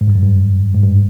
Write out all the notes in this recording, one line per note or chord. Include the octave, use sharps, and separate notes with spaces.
G#2
G2
F#2
G2
G#2
G2